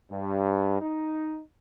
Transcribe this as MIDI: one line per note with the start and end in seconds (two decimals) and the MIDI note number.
0.11 0.79 43
0.81 1.40 63